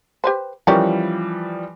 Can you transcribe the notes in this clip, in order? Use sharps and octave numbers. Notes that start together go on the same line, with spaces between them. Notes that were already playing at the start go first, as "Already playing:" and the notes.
G4 B4 C5
E3 F3 G3 C#4 G4 A#4